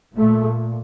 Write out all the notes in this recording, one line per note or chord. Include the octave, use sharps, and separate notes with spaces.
A#2 A3